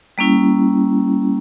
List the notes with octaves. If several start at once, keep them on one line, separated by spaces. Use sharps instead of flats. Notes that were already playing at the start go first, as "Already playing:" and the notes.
G3 A#3 C#4 E4